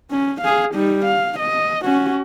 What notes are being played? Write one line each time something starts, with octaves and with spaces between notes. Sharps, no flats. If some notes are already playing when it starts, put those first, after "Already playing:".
C#4
G#4 F5
G3 D#4
F5
D#5
C#4 F#4